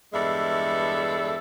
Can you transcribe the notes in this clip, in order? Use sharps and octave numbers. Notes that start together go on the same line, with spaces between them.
E2 G2 G#3 A4 D5 E5